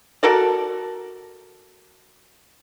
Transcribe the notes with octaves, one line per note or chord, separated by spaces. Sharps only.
F#4 A4 A#4 D5